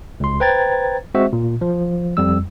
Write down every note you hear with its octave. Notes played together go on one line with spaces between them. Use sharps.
C#2 C6
B4 C5 G5 A#5 G#6 A6
G#3 C4 F#4 C5 E5
A#2
F3
F2 G3 E6